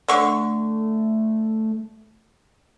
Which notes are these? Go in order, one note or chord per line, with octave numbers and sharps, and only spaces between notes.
D3 A3 C#6